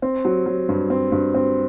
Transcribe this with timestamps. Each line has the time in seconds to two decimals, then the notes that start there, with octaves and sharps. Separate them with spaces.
0.02 C4
0.25 F#3
0.46 F#3
0.69 G2
0.90 C4
1.12 G2
1.34 C4